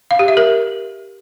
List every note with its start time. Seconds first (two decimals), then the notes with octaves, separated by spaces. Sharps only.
0.11 F5
0.19 G4
0.28 E5
0.37 A#4